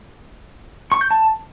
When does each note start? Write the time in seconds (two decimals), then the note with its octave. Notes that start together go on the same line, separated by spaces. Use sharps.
0.92 C#6
1.01 G6
1.11 A5